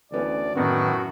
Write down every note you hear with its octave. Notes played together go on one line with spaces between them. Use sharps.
D2 E3 B3 C#4 D5
F#2 A2 D#3 B3 F#4